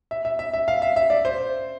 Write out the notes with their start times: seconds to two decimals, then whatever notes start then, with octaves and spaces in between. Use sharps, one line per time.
0.11 E5
0.25 E5
0.39 E5
0.54 E5
0.68 F5
0.82 E5
0.96 E5
1.10 D5
1.25 C5